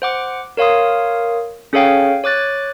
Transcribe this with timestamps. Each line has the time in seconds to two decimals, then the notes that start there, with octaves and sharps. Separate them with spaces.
0.02 C5 F#5 D6
0.57 A#4 C#5 F5 C6 D#6
1.73 C#4 G#4 A4 C#5 F5 G5
2.24 C#5 D6 F#6 A6